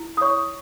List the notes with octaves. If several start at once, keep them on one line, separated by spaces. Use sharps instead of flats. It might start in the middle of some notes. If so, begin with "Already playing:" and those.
Already playing: E4
D#6
C#5 C#6